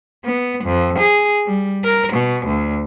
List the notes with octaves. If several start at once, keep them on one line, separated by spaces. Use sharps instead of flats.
B3
F2
G#4
G3
A#4
B2
D2